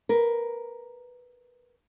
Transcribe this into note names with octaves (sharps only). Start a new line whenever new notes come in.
A#4 B4